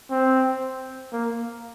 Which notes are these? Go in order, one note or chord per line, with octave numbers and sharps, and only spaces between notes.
C4
A#3